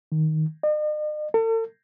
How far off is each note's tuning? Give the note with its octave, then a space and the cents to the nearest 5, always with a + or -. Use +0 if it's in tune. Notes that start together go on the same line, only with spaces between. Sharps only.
D#3 +5
D#5 -45
A4 +40